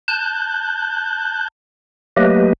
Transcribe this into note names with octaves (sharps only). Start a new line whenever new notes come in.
A5 F#6 G6
F#3 A3 A#3 G4 B4 D#5